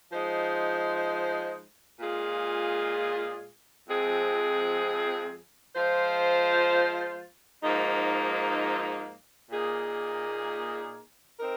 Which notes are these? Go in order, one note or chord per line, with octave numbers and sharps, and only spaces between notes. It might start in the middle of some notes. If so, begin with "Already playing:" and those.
F3 G#3 D#4 C5
A#2 G#3 F4 G#4
F2 F3 G#3 C4 G#4
F3 G#3 F4 C5
G#2 F3 A#3 D#4
A#2 A#3 D#4 G#4
C4 D#4 A#4